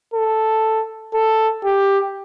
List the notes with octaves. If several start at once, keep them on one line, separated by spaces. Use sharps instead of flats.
A4
A4
G4